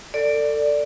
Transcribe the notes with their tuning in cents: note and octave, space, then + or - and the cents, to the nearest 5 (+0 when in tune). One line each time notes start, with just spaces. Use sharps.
A4 +30 D5 +0